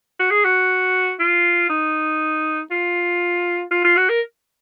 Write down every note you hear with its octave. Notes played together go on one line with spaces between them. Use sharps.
F#4
G#4
F#4
F4
D#4
F4
F4
F4
F#4
A#4